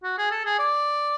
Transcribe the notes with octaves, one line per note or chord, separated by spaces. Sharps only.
F#4
G#4
A4
G#4
D5